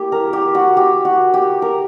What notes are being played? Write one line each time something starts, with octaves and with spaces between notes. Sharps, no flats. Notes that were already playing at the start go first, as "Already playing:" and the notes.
Already playing: A#3 E4 G4
A#4
G4
F#4
G4
F#4
G4
A#4